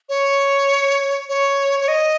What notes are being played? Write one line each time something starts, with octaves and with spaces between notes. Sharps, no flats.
C#5
C#5
C#5
D#5